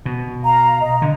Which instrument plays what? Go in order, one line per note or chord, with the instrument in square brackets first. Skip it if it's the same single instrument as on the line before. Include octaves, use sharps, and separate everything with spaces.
[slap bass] B2
[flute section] F5 A#5
D#5
[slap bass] D3